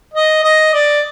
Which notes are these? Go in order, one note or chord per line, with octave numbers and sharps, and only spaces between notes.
D#5
D#5
D5